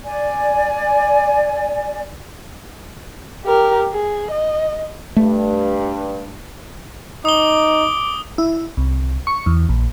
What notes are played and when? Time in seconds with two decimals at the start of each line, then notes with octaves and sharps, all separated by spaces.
0.03 D5 G#5
3.45 G4 A#4
3.93 G#4
4.31 D#5
5.16 G2 A3
7.25 D#4 D6 D#6 G7
8.38 E4
8.77 C2
9.27 C#6
9.46 E2
9.69 A#1